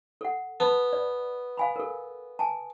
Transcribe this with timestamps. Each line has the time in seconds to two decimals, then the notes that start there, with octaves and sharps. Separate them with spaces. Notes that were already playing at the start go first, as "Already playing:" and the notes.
0.21 A4 F#5
0.60 B3 A5 B5
0.93 D5
1.57 F5 G#5 B5
1.76 A4 A#4
2.39 G#5 A5